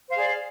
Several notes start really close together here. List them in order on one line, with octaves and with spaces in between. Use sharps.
C5 F5 G#4 D5